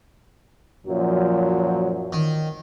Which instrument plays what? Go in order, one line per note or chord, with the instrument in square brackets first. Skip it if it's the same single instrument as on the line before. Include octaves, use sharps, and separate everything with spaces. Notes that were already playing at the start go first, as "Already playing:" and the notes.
[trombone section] F#2 A#2 F3 [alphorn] F#3
[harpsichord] D#3